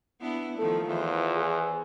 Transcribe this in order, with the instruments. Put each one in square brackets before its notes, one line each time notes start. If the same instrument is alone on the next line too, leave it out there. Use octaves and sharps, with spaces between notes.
[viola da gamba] B3 D4 E4
[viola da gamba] D#3 F3 A3 [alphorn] A4
[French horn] E2 [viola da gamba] E3 C5 [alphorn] F4
[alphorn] G#4